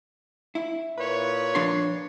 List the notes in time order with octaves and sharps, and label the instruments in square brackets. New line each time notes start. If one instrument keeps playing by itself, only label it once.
[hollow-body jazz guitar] E4
[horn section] A#2 B4 C#5
[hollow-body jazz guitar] F3 D4 C6